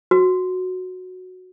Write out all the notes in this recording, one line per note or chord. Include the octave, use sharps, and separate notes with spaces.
F#4